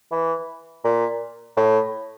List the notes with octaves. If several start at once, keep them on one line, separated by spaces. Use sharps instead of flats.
E3
A#2
A2